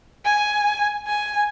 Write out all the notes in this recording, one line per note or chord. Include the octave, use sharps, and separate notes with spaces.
G#5
G#5